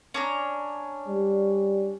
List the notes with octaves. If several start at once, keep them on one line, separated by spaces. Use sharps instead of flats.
C#4 D4 A#5
G3